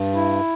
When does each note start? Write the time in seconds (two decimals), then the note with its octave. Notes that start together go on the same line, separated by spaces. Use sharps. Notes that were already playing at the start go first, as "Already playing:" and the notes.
Already playing: G2
0.15 E4